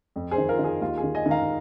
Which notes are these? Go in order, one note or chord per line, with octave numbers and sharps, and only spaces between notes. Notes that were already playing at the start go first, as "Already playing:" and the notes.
F2
G#4 C5
D#3
F4 A#4
D#3
G#4
D#2 F4
G#4
D#3
D#5 G#5
D#3
F5 A#5